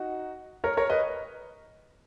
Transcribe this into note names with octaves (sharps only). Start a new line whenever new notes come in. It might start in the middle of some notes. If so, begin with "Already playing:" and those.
Already playing: D#4 F#4
A#4 C#5
A#4 C#5
B4 D#5